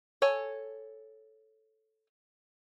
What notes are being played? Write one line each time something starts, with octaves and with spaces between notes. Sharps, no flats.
A4 C#5 G#5